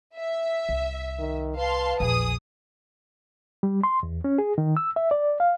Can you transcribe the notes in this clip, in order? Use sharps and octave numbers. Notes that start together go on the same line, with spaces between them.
E5
C2
D#3
B4 F5 A5 C6
A#1 E2 G#4 D#6
G3
C6
E2
C#4
G#4
D#3
E6
E5
D5
F5